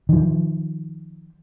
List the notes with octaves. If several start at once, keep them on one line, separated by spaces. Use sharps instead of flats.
D#3 F3